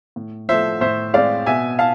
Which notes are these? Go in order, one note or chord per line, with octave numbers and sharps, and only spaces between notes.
A2
F3 A3 C5 E5
A2 C5 E5
G#3 C4 D5 F5
B2 E5 G#5
F5 A5